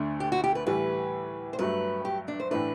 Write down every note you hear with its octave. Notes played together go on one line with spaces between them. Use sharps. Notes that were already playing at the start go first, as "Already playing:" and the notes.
Already playing: D2 D3 A3 D4
G4
F#4
G4
B4
A2 E3 G3 B4
C5
G2 F#3 A3 B4
G4
D4
C5
A2 E3 A3 D4 B4